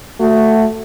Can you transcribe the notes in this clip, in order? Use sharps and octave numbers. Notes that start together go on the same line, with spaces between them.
A3 F#4